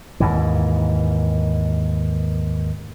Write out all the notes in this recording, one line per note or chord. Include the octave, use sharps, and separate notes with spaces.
D#2 G#2 E3